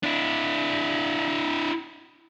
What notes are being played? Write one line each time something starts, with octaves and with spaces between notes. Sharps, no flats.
D4 E4